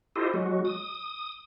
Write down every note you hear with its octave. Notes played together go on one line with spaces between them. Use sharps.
E4 F4 G4 A4 C5 D#5
F#3 G#3 F#4
D#6